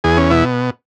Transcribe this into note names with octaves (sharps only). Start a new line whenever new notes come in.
E2 G#4
C#4
B2 E4